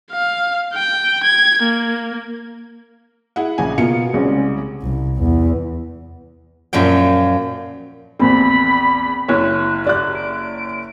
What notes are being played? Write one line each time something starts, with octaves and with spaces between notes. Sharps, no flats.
F5
G5
G#6
A#3
E4 G#4 F#5
A#1 C#3 G#5
B2 A#3 F4 C#7
C2 C#3 G#3 C#4
C2
E2
F#2 A#2 F3 G5
A#1 E2 A#3 C4 B5
F#1 E4 C#5 F#6
D5 F#6
D7